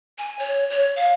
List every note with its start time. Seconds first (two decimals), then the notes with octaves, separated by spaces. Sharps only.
0.18 G#5
0.39 C#5
0.70 C#5
0.96 F5